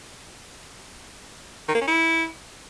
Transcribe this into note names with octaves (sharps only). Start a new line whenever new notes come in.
D#3
A#3
C#4
E4